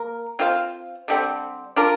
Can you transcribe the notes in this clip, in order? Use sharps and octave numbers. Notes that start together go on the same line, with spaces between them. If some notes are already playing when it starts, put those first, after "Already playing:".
Already playing: A#3 A#4
C4 F4 C5 F5
D3 G3 C4
D4 F4 A#4